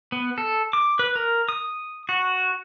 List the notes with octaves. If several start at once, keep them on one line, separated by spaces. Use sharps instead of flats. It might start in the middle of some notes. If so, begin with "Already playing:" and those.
B3
A4
D6
B4
A#4
D#6
F#4